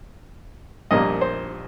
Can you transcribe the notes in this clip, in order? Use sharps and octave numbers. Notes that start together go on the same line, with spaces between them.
A#1 A#2 G3 A#3 D#5
C5